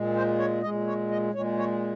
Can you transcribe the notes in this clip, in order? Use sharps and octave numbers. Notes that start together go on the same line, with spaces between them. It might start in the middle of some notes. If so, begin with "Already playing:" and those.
Already playing: A#2 G#3
C5
C#5
A#2 G#3 D#5
C#5
D#5
A#2 G#3 C#5
C#5